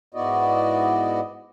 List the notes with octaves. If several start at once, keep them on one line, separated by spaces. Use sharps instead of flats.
G#2 B3 E4 F#4 D5 D#5